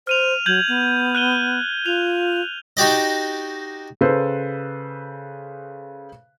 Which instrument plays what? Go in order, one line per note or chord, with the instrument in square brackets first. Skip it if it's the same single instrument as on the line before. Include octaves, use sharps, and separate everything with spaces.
[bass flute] C5 [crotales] F6 D#7 F7
[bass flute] F#3 [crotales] G6 G#6 F#7
[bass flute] B3
[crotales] F#6 D#7 G7
[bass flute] F4 [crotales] F7
[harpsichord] D#4 F#4 G4 D5 D#5
[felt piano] C#3 A4 B4 C5